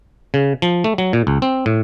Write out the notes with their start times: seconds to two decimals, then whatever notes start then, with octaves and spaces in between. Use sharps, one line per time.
0.34 C#3
0.62 F3
0.84 A3
0.98 F#3
1.13 A#2
1.27 C#2
1.42 C4
1.66 A2